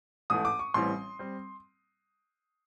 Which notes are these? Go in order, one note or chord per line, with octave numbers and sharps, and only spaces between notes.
A1 G#2 E3 A3 D#6
D6
C#6
A1 A2 E3 G3 C4 C6
G3 C4